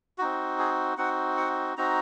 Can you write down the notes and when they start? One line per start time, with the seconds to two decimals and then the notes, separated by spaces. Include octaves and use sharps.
0.18 C4 D#4 F#4
0.59 G#4
0.97 C4 D#4 F#4 F#5
1.37 F#5
1.77 C4 D#4 F#4 A#5